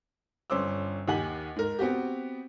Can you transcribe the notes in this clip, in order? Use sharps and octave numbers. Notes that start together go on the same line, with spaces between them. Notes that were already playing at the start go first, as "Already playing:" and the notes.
G1 C#4 C5 D6 E6
D#2 D#3 G4 F#5 G#5 F#7
G#2 A#4
B3 C4 F#4 G4